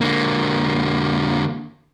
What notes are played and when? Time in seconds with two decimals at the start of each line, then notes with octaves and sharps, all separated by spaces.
0.01 D3 A#3